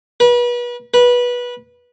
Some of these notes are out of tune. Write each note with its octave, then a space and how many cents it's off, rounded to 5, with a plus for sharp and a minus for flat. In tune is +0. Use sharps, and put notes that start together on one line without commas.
B4 -35
B4 -20